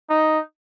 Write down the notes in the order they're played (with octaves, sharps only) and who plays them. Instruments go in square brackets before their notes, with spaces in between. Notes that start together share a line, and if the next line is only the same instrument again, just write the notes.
[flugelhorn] D#4